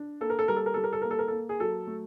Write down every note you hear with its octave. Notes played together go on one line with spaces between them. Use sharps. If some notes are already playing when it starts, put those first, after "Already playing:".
Already playing: D4
A#3 A4
A#4
A4
G3 A#4
A4
A#4
G3 A4
A#4
A4
A#3 A#4
A4
A#4
A#3 A4
G#4
F#3 A4
A3